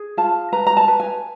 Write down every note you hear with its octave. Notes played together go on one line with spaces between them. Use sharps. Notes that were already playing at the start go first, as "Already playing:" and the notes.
Already playing: G#4
F4 A5
B4 A#5
A#5
A5
B4
G#5